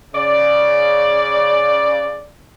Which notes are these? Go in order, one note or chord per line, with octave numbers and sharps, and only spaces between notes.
C#3 D5